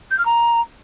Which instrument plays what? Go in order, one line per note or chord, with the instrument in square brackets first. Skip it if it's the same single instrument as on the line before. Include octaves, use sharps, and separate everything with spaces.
[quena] G6
F6
A#5